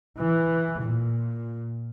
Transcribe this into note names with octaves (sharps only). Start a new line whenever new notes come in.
E3
A#2